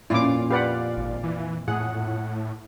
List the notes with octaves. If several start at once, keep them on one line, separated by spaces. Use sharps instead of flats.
F2 A#2 C#4 E4 F4 D5 D6
G4 B4 D5 F5 F#5
G#1
E3
A2 G#4 F#5